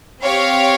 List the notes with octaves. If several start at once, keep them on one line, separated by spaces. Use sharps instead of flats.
C4 G4 C#5 F5